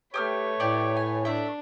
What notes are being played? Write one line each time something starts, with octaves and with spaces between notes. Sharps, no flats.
A3 G4 B4 C#5 D#6 F6
A2 G4 D5
G#5
A3 D4 E5